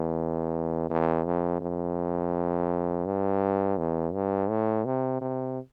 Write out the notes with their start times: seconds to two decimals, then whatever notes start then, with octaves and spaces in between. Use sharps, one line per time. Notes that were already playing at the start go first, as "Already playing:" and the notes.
Already playing: E2
0.90 E2
1.26 F2
1.61 F2
3.06 G2
3.78 E2
4.13 G2
4.49 A2
4.85 C3
5.21 C3